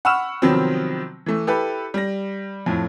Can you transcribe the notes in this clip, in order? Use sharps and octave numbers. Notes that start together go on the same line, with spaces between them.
F#5 B5 C#6 E6 F6 E7
C3 D#3 F3 F#3 B3 C4
E3 A3
E4 G4 A4 B4
G3 A#6
F2 A2